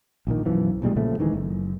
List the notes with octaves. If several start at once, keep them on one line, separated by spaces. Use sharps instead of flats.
A#1 A#2 D#3
B1 F#2 E3 F3
B1 A#2 G3 G#3
A#2 C#3 F3 A3
D1 D#3 E3 G#3
F#1